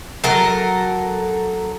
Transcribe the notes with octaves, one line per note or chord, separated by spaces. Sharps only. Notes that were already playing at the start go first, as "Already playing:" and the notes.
F#3 A4 A#4